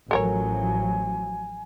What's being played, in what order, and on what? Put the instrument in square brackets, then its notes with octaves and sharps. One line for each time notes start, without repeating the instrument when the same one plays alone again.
[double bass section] A1 F3 F#3 [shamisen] A4 A#4 C#5 [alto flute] G#5